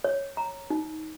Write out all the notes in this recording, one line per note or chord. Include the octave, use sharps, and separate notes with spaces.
C#5
A#5
D#4